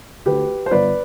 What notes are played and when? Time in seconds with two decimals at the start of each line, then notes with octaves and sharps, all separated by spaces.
0.26 D2 D3 G4 B4
0.66 C5
0.71 G1 B4 D5